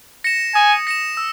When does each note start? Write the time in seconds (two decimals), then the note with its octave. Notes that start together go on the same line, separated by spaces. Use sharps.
0.24 A#6 C#7 E7
0.55 G#5 D#6
0.87 A#6 C#7 E7
1.17 E6